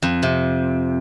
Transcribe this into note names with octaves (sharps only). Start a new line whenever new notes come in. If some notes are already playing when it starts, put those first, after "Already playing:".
F2
C3